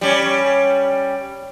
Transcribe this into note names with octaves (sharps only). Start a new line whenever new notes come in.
G3 C#4